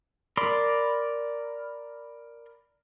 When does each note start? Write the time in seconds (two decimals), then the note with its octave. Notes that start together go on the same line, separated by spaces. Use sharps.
0.37 A#4 D5 B5 C6